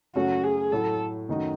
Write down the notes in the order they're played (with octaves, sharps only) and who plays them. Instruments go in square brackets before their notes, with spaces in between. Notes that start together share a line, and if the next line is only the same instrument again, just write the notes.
[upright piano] F#2 C#3 F#3 A3 C#4 [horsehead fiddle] F#4
[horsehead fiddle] G#4
[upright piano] A2 F#3 A3 [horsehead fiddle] A4
[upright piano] F#2 D#3 A3 D#4 F#4